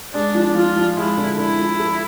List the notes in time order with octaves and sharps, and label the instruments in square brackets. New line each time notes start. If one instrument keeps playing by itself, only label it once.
[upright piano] G#3 [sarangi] D4
[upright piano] F3
[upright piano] F3 [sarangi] F4
[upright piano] F3
[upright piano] G#3 [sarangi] E4
[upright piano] D3
[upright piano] D3 [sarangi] E4
[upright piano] F3
A4